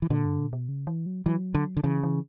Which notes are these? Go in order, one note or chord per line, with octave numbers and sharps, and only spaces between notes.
E3
A#2 D3
G2
A#2
B2
C#3
E3
F#3
E3 F#3
D3
D3
C#3 E3
E3